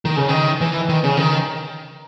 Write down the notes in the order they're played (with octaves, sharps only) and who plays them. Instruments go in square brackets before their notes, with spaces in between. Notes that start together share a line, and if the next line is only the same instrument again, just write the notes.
[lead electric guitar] D#3
C#3
D#3
E3
D#3
C#3
D#3